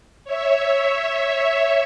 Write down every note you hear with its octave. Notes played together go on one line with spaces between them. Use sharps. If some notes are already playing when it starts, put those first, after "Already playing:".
C#5 E5